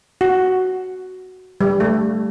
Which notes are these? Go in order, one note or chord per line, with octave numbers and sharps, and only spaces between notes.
F#4
G3
A3